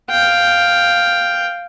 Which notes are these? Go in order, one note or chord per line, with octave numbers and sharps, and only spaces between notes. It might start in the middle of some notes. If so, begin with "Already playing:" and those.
F5 G5